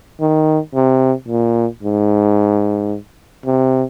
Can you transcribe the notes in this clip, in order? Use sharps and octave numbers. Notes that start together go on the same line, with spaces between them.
D#3
C3
A#2
G#2
C3